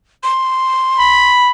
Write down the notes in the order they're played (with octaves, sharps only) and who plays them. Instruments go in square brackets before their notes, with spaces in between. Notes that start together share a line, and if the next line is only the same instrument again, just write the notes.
[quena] C6
[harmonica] B5